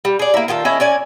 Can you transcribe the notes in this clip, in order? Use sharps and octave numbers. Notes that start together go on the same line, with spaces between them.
G3
G#4 D5
A#3 E4
D#3 F4 G4 A4
C#4 E4 G#4 D#5
C#4 D5 G#5